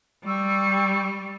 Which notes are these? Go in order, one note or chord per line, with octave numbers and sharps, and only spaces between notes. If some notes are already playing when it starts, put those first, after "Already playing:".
G3 G5 C#6 E6